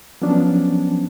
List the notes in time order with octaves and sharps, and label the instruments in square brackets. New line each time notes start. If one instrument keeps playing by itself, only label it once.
[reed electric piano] F3 F#3 B3 C#4 D4